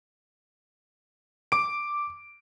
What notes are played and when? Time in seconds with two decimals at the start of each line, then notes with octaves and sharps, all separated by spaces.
1.52 D6 D7